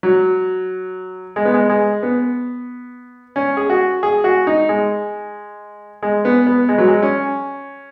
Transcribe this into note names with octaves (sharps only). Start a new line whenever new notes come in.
F#3
G#3
B3
G#3
G#3
B3
C#4
G#4
F#4
G#4
F#4
D#4
G#3
G#3
B3
B3
G#3
F#3
G#3
C#4